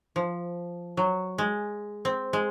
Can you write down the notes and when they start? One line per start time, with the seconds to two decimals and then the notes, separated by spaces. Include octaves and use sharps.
0.16 F3
0.97 F#3
1.38 G#3
2.05 C4
2.33 G#3